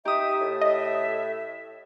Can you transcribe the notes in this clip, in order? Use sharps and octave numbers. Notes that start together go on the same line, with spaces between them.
D#4 G4 E5 D#6
A2
D#5 E5